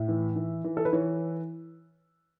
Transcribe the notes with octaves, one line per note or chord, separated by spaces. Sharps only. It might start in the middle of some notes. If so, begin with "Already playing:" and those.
Already playing: A2 E5
E3
E3
E3
A4
B4
E3 C#5